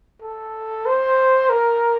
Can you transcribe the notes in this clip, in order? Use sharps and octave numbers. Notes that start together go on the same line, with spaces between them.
A4
C5
A#4